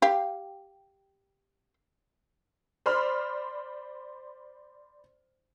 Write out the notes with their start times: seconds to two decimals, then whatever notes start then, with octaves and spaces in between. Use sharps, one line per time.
0.02 G4 F5
2.86 C5 D5 B5 C6 F6